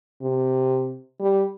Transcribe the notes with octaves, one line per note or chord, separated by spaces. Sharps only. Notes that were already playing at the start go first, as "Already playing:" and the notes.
C3
G3